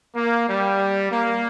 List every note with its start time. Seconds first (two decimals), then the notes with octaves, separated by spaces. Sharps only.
0.15 A#3
0.48 G3
1.11 A#3